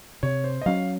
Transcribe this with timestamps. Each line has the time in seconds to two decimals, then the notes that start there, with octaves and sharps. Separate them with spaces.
0.23 C3 C#5
0.44 C5
0.61 D#5
0.66 F#3 C#4 F5